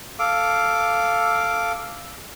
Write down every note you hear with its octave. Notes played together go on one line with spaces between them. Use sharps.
A4 F5 D6